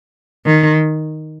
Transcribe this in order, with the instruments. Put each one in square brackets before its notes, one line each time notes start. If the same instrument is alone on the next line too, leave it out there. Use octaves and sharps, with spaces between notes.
[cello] D#3